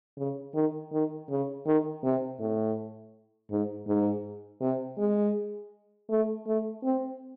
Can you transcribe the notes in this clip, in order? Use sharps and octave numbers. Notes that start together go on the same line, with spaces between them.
C#3
D#3
D#3
C#3
D#3
C3
A2
G#2
G#2
C3
G#3
A3
A3
C4